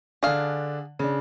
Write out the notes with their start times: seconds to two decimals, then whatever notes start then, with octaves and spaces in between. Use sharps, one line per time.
0.23 D3 D4 G#4 F5
0.99 C#3 D4